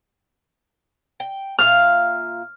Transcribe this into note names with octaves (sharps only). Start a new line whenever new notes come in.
G5
A#2 F4 E5 F6